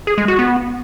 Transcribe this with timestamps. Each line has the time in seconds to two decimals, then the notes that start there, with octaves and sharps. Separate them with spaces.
0.07 G#4
0.18 G#3
0.28 F#4
0.39 B3